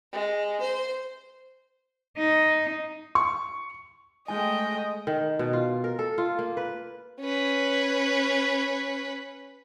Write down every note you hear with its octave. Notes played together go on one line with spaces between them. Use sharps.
G#3
C5
D#4
C#6
G#3 A3 D#5 G5 G#5
D#3
B2
F4
A#4
A4
F4
A#3
B4
C#4 B4